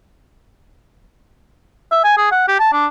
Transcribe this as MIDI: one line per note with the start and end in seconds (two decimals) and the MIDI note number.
1.92 2.01 76
2.04 2.14 80
2.18 2.32 68
2.32 2.47 78
2.48 2.58 67
2.60 2.73 81
2.73 2.86 62